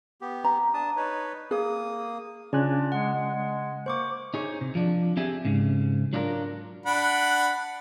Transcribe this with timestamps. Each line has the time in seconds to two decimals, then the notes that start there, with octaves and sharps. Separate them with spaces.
0.21 B3 G4
0.44 A#5
0.74 D4 A5 D#6
0.97 D#4 B4 C#5
1.51 A#3 G#4 D#6
2.53 C#3 D4 F4 D5 G#5 F#6
2.92 G#3 F#5
3.14 G#3
3.35 G#3
3.86 A#3 C5 C#6 D6
4.34 D#4 G#4 C#5
4.61 C3
4.75 F3 D4
5.17 C4 G4 G#4 E5 G#5
5.45 G#2 C#3
6.13 F#3 D4 F4 G4 A#4
6.86 D4 F#5 B5